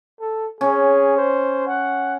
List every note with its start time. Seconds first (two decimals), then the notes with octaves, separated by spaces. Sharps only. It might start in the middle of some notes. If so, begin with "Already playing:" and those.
0.20 A4
0.61 C#4 G#4
1.17 C5
1.67 F#5